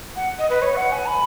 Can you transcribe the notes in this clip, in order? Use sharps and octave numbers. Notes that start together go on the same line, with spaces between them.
F#5
D#5
B4
C#5
F#5
G#5
B5